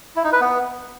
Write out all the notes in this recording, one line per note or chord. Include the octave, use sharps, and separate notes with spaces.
E4
D#4
B4
B3